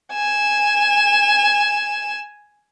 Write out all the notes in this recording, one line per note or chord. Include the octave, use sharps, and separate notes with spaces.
G#5 E7